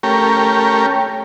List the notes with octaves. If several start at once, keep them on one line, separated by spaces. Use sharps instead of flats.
A3 C#4 G4 A#4